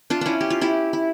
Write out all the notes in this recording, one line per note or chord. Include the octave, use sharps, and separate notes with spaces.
D4 F4
C#4 D4 E4
G4
F4
E4 G4
E4